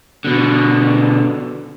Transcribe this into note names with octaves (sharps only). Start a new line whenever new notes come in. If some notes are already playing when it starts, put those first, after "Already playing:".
B2 D3